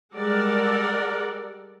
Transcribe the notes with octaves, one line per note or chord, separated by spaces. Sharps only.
G3 G#3 A4 A#4 D5 F#5